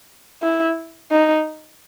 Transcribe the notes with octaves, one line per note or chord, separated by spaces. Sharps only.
E4
D#4